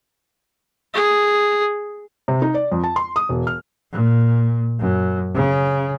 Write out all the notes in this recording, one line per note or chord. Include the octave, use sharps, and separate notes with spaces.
G#4
C3
D#4
D5
F2
A5
C6
D#6
E1
F6
A#2
F#2
C#3